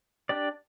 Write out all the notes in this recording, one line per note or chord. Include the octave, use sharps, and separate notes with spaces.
D4 G4 D5